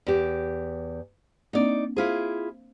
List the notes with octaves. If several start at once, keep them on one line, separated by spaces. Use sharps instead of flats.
E2 G4
A#3 C4 D4 D#4 D5
E4 F4 G#4 C5 F5